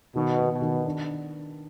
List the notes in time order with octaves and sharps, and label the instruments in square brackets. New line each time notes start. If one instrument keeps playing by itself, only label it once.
[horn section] B2 [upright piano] D#3
[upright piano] B3
[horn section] B2
[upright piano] D#3
D4